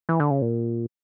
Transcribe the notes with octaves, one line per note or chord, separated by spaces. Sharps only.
E3
D3
C#3
A#2